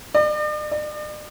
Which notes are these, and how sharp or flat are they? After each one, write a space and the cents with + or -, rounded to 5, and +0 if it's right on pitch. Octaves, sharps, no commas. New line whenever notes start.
D5 +45
D5 +45